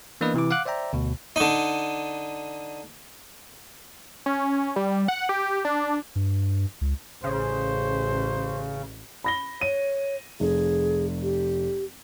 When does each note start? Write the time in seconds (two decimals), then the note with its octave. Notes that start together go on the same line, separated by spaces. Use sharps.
0.21 E3 A#3 B3 D4 B4 D#5
0.34 C3 E3 E4 D6
0.51 F5 F#5 D6 F#6
0.65 C5 D5 E5 G5 A#5
0.93 D2 B2
1.36 D3 D#4
4.26 C#4
4.76 G3
5.08 F#5
5.29 G4
5.65 D4
6.16 G2
6.81 C#2
7.24 A1 C#3 C5
9.24 B5 A#6 G7
9.61 C#5 D#7
10.40 F1 G#4
11.23 G4